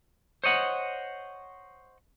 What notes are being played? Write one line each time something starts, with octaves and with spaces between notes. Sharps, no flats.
C5 C#5 D#5 F#5